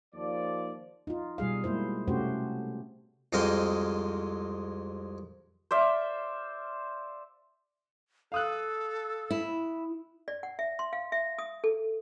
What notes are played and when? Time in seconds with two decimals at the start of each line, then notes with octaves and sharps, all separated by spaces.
0.15 D#2 F3 D5
1.07 D#4 F4
1.38 B2 G3 G#4 F5
1.64 G#3 A#3 E4 C5
2.08 C3 A3 C#4 F#4 G4 C5
3.33 C2 F2 G#3 D#5 F5 G5
5.71 C5 D5 E5 F5
8.32 A4 F5 D#6 F#6
9.31 E4
10.28 D5
10.43 F#5
10.59 E5
10.79 C6
10.93 F5
11.12 E5
11.38 D#6
11.64 A4